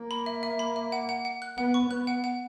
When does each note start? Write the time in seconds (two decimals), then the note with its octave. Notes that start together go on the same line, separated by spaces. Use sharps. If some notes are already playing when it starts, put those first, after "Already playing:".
Already playing: A#3
0.11 B5
0.26 E5
0.43 E5
0.59 B5
0.76 E5
0.92 F#5
1.09 F#5
1.25 F#5
1.42 F#6
1.58 B3 F#5
1.74 C#6
1.90 B3 F#6
2.07 F#5
2.24 F#5